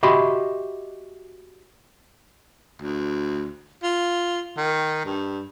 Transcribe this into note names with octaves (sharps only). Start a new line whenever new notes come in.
F#4 G4 D#5 E5 B5 C6
D2
F4
D#3
G2